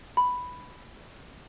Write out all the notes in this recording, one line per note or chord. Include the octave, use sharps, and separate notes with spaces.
B5